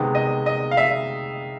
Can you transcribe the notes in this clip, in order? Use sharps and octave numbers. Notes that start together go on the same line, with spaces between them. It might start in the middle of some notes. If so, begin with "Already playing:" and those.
Already playing: C3 D#3 G#3 B3
D#5
D#5
F5
E5